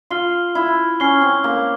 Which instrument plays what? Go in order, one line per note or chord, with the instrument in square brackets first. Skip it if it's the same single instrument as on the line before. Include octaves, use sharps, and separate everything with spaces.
[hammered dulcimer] F4 [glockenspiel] F6 C7 G7
[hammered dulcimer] E4
[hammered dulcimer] C#4 [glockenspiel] F6 C7 G7
[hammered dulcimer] C4
A#3